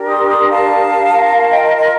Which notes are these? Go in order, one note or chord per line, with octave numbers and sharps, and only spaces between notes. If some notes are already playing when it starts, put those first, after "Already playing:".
Already playing: D4 G4 A#4
C6 D#6
D6
C6 D#6
F5 A5
F4 A#4
D#5 G5
D#5
D#5